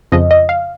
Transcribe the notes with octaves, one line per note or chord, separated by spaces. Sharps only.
F2 C#3 F3 D#5
D#5
F5